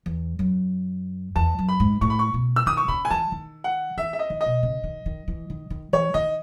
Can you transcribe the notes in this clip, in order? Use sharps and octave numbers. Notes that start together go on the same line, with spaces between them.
E2
F#2
E2 A5
F#2
B5
G#2
A2 C#6
B5
C#6
B2
E6
D#3 D#6
C#6
C#3 B5
G#5
E3 A5
D#3
F#5
E3 E5
E5
D#5
D#3
D#5
B2
C#3
D#3
D#3
E3
D#3
D#3
E3 C#5
D#3 D#5